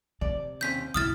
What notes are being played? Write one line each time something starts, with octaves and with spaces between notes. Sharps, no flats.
C3 D5
D#2 C4 C#4 G6 B6
C#2 F#2 B2 E4 D#6 F6 A6